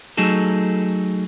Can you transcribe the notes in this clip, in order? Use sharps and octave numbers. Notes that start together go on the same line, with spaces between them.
F#3 A3 D#4 G#4 A4